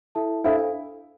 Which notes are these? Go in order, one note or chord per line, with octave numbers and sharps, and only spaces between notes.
E4 A4 E5 A5
D4 E4 A4 C5 F5